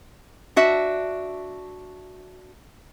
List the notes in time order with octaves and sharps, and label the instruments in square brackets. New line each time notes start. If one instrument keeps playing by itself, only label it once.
[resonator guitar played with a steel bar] D4 F#4 E5